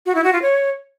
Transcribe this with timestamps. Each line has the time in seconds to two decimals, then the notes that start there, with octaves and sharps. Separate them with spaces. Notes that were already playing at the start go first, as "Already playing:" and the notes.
0.06 F#4
0.15 E4
0.24 F#4
0.33 F4
0.42 C#5